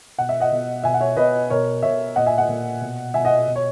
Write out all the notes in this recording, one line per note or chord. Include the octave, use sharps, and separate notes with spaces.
B2 F#5
E5
D#5 F#5
B2
B2 E5 G#5
F#5
C#5 E5
B2 B4 D#5
B2 A#4 C#5
B2 C#5 E5
A#2 D#5 F#5
E5 G#5
D#5 F#5
A#2
B2
B2 E5 G#5
D#5 F#5
B2
C#5